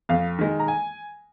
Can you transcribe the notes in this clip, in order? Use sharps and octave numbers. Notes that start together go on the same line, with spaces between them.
F2 F5
D#3 G#3
A#5
G#5